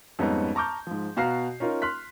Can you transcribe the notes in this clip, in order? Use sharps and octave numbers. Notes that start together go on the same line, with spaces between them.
F2 G#2 G3 B3 C#4 D#4
A5 A#5 C#6 D6 F6 G6
G#2 F3
B2 F#4 F5 A#5 F6 C7
C#4 D#4 F4 A#4
C6 F6 F#6 B6